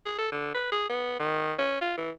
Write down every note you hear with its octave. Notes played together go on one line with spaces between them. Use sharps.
G#4
A4
D3
B4
G#4
B3
D#3
C#4
F4
E3